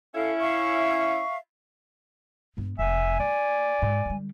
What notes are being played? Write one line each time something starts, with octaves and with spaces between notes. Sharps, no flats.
C#4 E4 A4 F5
E5 F5 C#6
G2 B3
F1 E5 G#5
A#3 D5
G#2
D3 G3